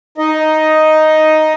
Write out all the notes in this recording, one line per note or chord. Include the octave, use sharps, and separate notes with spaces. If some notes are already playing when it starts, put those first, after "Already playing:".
D#4 D#5